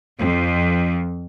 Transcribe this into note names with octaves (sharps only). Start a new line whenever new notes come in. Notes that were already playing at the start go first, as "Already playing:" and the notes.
F2